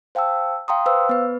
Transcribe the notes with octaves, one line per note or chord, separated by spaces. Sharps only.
C5 F5 G5 A5 E6
F5 G5 A#5 C6 D#6
B4 C5 F5 E6
B3 B4